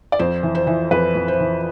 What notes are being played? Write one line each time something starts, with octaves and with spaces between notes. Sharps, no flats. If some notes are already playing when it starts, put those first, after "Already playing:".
D5
F2 C5
E3
C5
E3
F2 B4
F2
C5
E3